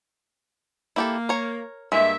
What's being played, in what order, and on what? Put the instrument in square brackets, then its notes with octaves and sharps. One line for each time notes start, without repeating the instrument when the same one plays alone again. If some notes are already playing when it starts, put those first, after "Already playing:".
[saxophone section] A#3 [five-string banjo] E4 G4 A4
[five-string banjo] A#4 C#5
[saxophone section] G2 A#3 E5 [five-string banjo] G#3